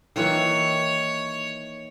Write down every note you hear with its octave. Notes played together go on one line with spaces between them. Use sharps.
D#3 E3 A#3 C#5